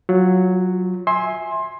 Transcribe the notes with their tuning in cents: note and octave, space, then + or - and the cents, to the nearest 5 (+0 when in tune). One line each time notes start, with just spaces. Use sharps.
F#3 +0 F4 +15
E5 -15 G#5 +0 C6 +20